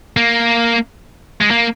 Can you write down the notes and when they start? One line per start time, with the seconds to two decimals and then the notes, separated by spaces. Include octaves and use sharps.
0.17 A#3
1.41 G#3
1.50 A#3